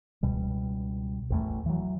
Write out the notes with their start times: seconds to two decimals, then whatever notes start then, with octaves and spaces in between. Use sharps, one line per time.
0.23 C#2 B2 G3
1.30 A1 E2 A3
1.66 E3 F#3